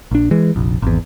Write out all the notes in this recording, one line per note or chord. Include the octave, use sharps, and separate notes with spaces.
A#1 D4
E3 G#3
F1 A#1
G#1 E2